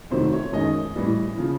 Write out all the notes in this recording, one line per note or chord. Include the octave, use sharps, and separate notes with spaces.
F2 C3 D#3 F#3 A3 C5
C#5
F#2 D#3 G#3 D#5
A2 E3 G3
C#3 F3